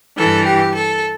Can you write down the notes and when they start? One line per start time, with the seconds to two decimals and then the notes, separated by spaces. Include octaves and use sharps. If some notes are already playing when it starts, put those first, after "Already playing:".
0.18 G2 E3 A4
0.46 G4
0.75 A4